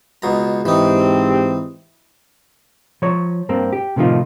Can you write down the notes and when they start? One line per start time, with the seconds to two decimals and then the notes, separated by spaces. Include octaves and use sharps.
0.22 C#2 B2 A#5
0.66 G#2 E3 C4 D#4 G4
3.02 F3 C#5
3.49 G2 A#3 C4
3.73 G4
3.96 A2 C3 D#3 F3 D#4 F4